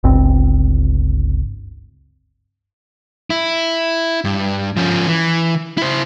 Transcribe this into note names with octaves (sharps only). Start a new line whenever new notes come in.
G1 C#2 C4
E4
G2
F3 C#4
E3
E4 C5